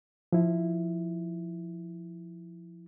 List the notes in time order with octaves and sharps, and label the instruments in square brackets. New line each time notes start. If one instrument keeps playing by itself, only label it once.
[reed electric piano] F3 E4